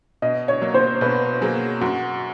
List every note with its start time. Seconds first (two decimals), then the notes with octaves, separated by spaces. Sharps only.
0.22 B2 D#5
0.48 C#5
0.62 F#3 A#3
0.74 C5
1.01 B2 B4
1.41 F#3 A#3 G#4
1.81 F#2 F#4